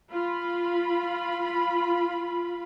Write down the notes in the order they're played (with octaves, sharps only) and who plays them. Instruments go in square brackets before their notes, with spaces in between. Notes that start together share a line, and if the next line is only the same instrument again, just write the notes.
[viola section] F4 B5